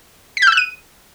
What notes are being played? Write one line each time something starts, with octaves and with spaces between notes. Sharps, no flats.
B6
G6
E6
F#6
D#7